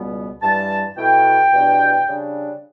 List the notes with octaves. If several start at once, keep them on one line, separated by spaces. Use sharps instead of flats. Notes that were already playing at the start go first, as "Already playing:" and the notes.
Already playing: C#2 B2 G3 B3
G2 E3 G3 A5
B2 A3 E4 G5
E2 B2 G3 D4
C#3 G3 D4